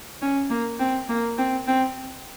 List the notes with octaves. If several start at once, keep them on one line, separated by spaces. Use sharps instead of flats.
C#4
A#3
C4
A#3
C4
C4